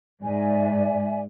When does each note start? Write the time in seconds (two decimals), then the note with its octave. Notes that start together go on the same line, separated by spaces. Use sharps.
0.23 G#2 D5 E5 G#5